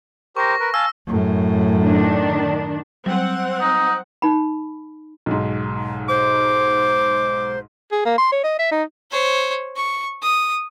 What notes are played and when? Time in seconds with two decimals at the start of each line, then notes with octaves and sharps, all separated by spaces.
0.37 G4 A#4 C5 C#6 A#6
0.60 A#4 B4
0.74 F5 G#5 A5 E6
1.07 F#2 A2
1.84 D#3 D4
3.06 F#3 G3 C4 F#5
3.61 D#4
4.22 D#4 B5
5.26 B1 G#2
6.09 C5 D6
7.92 G#4
8.05 A#3
8.18 C6
8.32 C#5
8.44 D#5
8.59 E5
8.71 D#4
9.11 C5 C#5
9.76 C#6
10.23 D#6